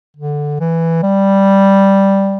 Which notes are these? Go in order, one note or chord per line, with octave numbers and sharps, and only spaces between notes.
D3
E3
G3